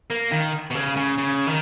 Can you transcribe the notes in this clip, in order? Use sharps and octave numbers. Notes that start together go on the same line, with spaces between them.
A#3
D#3
B2
C#3
C#3
C#3
D#3